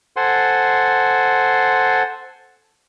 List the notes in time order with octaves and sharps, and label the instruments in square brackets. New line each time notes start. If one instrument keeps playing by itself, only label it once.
[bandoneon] A4 C5 F#5 G#5 C6